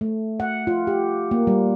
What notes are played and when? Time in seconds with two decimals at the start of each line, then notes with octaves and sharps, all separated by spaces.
0.01 A3
0.40 F#5
0.67 F4
0.87 G4
1.31 A#3
1.47 G3